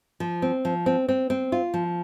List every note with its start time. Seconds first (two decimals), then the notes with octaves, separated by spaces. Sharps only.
0.20 F3
0.42 C4
0.65 F3
0.86 C4
1.09 C4
1.30 C4
1.52 F4
1.74 F3